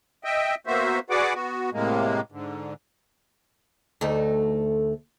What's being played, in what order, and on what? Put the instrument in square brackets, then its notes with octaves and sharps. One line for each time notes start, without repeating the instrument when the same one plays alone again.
[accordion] D#5 E5 G5
A#3 B3 F#4 C5 E5
F#4 G#4 B4 D5 F#5 D6
B3 F#4
A2 C3 G#3 A#3
G#2 D3
[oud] D2 A3 D#4